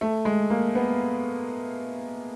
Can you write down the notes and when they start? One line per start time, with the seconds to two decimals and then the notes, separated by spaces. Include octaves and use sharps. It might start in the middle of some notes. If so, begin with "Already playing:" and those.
0.01 A3
0.25 G#3
0.50 A#3
0.75 B3